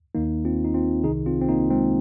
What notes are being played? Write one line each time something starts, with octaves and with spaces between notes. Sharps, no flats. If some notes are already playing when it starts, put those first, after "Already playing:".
D#2 D#3 A#3 D#4
C4 F4
D#4
C4 F4
C2 C3 D#3 D#4 G#4
C4 F4
C4
A#3 D#4
G#3 C4